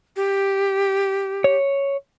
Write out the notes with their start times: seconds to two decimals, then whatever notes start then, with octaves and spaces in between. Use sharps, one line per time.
0.16 G4
1.44 C#5